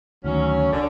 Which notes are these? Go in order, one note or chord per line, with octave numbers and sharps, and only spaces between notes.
D2 D#3 F#3 C#4
C2 D3